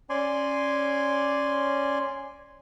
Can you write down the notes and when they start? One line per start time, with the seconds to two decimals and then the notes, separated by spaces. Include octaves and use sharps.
0.10 C#4 D5 G#5 C6